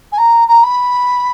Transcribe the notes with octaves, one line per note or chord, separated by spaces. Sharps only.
G#5
A#5
A#5
B5